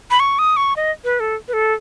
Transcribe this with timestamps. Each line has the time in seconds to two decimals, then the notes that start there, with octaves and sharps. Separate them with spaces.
0.11 B5
0.20 C#6
0.39 D#6
0.57 C#6
0.76 D#5
1.04 B4
1.20 A4
1.48 B4
1.53 A4